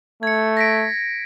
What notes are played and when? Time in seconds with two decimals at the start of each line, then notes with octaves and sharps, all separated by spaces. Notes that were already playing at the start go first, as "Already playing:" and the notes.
0.23 A3 G#6 C#7
0.57 A#6 B6 D7